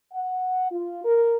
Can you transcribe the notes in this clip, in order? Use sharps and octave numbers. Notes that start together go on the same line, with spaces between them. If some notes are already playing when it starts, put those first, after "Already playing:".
F#5
F4
A#4